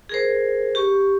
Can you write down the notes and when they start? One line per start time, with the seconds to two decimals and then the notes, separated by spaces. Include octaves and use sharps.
0.09 G#4 A#4 C5
0.75 G4 C#6